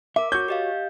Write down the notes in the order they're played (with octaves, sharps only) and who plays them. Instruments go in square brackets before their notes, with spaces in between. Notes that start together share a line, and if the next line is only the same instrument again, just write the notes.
[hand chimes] A#4 D6 [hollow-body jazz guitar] E5
[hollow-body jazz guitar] F#4 C#5 [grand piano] G6
[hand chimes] G4 D#5 F5